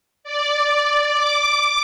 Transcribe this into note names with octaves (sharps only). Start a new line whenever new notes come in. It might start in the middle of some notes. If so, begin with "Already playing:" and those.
D5
D6